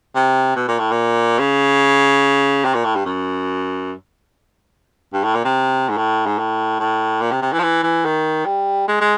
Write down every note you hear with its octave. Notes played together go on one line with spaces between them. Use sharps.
C3
B2
A#2
A2
A#2
C#3
C3
A#2
A2
G2
F#2
G2
A2
A#2
C3
G#2
A2
G#2
A2
A2
A#2
C3
C3
E3
F3
E3
E3
D#3
G3
G#3
G#3